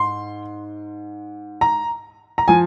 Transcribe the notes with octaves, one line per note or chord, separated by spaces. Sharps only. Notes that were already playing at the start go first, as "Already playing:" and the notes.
Already playing: G#2 C6
A#5
A#5
F3 G#5